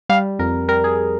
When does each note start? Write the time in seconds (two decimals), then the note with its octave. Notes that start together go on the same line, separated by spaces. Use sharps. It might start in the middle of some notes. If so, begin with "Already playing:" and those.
0.09 G3 F5
0.39 F2 A#4
0.69 G3 A#4
0.84 G#4